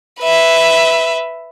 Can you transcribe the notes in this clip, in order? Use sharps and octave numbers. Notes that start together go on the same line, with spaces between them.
B4 E5